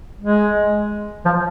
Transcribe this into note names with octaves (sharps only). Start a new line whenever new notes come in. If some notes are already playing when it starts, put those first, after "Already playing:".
G#3
F3